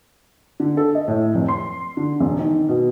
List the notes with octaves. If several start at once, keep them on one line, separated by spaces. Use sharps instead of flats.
D3
A4
D#5
A2
F1
C6
D3
E1
D#3
B2